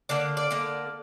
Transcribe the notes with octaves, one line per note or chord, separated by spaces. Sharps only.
D3 A#3 D5
D5
D3 A#3